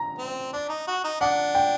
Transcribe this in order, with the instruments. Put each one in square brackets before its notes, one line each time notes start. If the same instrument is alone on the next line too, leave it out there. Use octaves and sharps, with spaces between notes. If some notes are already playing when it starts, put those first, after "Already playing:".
Already playing: [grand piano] A#5
[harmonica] C4
D4
D#4
F#4
D#4
[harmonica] D4 [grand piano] F#5
[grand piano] G5